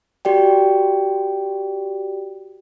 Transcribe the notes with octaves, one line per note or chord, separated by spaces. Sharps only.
F#4 G4 D5 G5